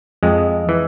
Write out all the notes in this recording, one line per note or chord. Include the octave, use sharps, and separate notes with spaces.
F2 G#3
E3